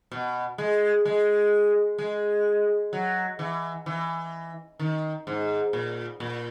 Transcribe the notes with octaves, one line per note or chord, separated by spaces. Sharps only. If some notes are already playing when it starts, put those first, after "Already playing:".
B2
G#3
G#3
G#3
F#3
E3
E3
D#3
G#2
A#2
A#2